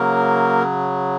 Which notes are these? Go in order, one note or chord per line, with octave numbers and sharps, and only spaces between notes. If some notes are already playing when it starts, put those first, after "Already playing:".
Already playing: C#3 F#3 A#3 A#4